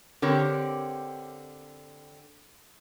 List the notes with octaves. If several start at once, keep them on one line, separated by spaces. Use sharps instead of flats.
D3 C4 G4 A#4 C#5